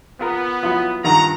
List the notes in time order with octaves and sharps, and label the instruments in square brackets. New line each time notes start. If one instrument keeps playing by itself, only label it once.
[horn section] B3 [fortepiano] F4 A#4
[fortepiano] F#3 E4 F4
[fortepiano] G2 D#3 F4 [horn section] F#5 A#5